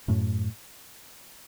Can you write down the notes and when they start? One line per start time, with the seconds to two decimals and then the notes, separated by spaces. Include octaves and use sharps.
0.08 F#2 A2